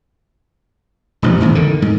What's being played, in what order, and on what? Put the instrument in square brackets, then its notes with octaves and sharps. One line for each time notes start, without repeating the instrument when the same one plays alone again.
[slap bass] E1 A1 F3
D#1 G#1 E2
D3 D#3
G#2